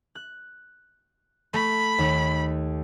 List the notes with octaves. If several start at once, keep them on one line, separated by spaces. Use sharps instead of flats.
F#6
A3 B5
D#2